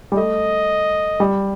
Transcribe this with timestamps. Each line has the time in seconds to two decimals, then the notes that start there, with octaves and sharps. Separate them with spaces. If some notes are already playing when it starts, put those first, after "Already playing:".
0.12 G3
0.17 A3 D#5
1.20 G3